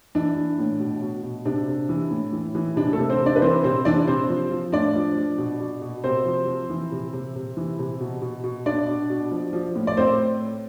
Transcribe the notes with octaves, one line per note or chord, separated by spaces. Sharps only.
E3 D4
E3
A2
B2
B2
B2
C3 D4
C3
E3
A2
E3
E3
C3 D4
A3 A4
C3
C4 C5
C3
D4 D5
B4
E3 C4 C5
C3 C4 C5
E3 D4 D5
C3 C4 C5
F3
F3
A2 D4 D5
F3
F3
B2
B2
B2
C3 C4 C5
F3
F3
E3
C3
C3
C3
E3
C3
B2
B2
B2
B2 D4 D5
B2
B2
F3
F3
A2
D5
A2 C4 C5